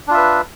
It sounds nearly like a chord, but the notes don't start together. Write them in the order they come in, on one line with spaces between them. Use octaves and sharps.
D4 F4 E5 B4